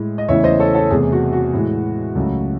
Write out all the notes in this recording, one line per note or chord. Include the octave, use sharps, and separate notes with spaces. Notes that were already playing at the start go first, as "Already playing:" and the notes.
Already playing: A2 G#3
D#5
E2 C#3 E3 A3 C#5 E5
C5 D#5
A4 C#5
A4 C#5
E2 C3 E3 A3 G#4
F#4
F#4
A2 E3 G#3
C#2 C#3 F#3 A3